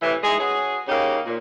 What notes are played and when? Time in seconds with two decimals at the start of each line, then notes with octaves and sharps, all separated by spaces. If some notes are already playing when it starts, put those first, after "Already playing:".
0.02 A2 C3 E3
0.24 G#3 D#4 E4 G#4
0.40 C#4 F#4 G#4
0.88 C#3 A#3 C#4 D#4 G4
1.26 A#2